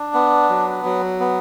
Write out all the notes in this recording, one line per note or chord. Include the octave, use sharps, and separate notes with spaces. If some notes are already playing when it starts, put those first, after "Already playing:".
Already playing: D4
B3
F#3
F#3
B3